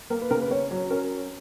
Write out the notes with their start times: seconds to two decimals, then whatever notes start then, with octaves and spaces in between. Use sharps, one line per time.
0.10 A#3 A#4
0.21 B4
0.30 C#3 A#4
0.41 B4
0.51 C#4 C#5
0.71 F#3
0.90 C#4 A#4